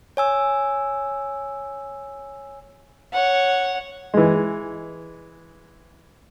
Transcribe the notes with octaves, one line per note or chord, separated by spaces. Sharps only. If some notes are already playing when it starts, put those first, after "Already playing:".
C#5 G#5 E6
C#5 F#5
E3 G#3